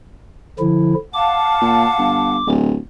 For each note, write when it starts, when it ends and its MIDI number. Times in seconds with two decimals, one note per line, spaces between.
0.59 0.94 50
0.59 0.94 53
0.59 0.94 64
1.14 2.35 77
1.14 2.35 78
1.14 2.35 81
1.14 2.48 86
1.61 1.86 46
1.98 2.40 31
2.46 2.77 26